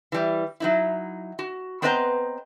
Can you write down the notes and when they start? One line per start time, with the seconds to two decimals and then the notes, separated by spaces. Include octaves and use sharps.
0.12 E3 G3
0.60 F#3 D#4 E4
1.39 F#4
1.82 B3 C4 B4 C5 D#5 A#5